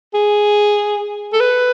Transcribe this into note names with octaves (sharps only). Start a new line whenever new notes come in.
G#4
A4
B4